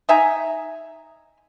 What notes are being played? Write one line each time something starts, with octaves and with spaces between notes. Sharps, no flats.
D#4 E5 G#5 A#5